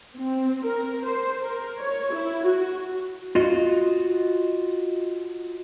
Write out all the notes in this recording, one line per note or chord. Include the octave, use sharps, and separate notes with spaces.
C4
A#4
C5
A#4
C#5
E4
F#4
F4 F#4 D#5